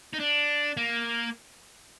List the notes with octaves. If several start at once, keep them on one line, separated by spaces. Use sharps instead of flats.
D#4
D4
A#3